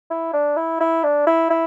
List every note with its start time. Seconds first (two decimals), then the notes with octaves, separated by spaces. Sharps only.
0.10 E4
0.33 D4
0.57 E4
0.80 E4
1.04 D4
1.27 E4
1.50 E4